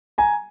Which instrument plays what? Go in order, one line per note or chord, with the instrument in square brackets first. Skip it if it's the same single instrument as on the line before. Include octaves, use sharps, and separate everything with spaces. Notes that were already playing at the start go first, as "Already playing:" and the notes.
[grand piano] G#5 A#5